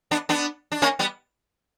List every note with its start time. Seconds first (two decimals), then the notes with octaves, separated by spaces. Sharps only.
0.11 B3 D4
0.29 B3 D4
0.72 D4
0.82 A#3 C#4
0.99 G3 B3